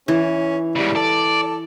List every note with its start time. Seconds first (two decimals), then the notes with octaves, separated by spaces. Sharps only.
0.08 E3 C#4
0.76 G#2 C#3 G3
0.96 A4 D5